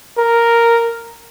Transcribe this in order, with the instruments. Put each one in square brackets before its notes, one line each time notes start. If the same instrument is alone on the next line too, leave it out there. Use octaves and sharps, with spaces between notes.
[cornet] A#4